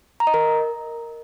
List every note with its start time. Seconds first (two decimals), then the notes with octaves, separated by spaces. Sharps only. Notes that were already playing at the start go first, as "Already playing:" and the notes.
0.20 A#5
0.27 D#5
0.34 A#4